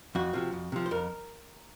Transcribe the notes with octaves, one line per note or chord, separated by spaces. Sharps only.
F2 F#4
C3 F3
F2
C3 F3
C5
F2 A#4